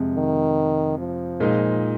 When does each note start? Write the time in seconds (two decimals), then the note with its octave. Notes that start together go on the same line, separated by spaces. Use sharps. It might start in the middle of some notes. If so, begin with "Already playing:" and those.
Already playing: F2 C3 G#3
0.15 D#3
0.98 F3
1.40 A#2 G#3 D#4